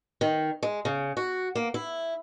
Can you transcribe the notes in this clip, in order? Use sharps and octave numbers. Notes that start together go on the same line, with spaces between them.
D#3
G#3
C#3
F#4
A#3
E4